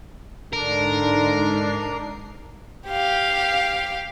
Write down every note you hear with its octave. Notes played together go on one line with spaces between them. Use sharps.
G#2 D3 D4 D#4 A#4 C7
G4 F5